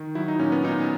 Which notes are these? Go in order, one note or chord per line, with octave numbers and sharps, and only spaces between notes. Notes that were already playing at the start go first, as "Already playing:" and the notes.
Already playing: D#3
F#3 E4
D#4
A#2 C#4
B3
A#2 D#4